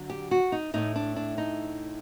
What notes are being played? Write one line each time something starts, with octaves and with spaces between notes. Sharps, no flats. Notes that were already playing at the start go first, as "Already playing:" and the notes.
Already playing: D3 F#3
G4
F#4
D#4
A2 A3 D#4
D4
D4
D#4